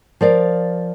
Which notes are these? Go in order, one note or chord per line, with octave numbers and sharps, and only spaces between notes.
F3 A#4 D5 F5